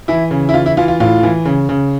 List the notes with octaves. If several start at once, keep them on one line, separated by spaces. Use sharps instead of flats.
E3 E4
C#3
E4
E3 F4
E4
E3 F4
F4
A2 F4
E3
C#3
C#3